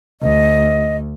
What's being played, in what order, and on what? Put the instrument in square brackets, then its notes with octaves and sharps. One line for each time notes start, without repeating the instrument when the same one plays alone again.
[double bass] D2 [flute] D#5